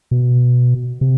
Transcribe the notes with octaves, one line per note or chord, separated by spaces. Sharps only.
B2
C3